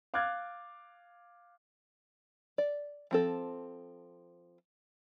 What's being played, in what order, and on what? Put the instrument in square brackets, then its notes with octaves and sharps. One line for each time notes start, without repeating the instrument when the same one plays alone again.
[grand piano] F5 D6 F6 F#6 G#6 A6
[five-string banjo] D5
F3 C4 A4